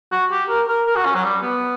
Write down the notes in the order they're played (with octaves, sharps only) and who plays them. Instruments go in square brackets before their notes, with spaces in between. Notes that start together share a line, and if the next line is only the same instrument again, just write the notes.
[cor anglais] F#4
G4
A#4
A#4
A#4
F#4
C#4
F#3
G3
B3